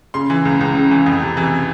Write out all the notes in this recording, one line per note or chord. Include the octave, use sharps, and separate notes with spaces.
C#3 C6
E3
C#2
C#2
C#3
E3
F2
C3
E3